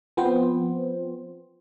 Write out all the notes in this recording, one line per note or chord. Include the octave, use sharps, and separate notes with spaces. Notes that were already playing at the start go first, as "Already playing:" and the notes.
F3 B3 C4 C5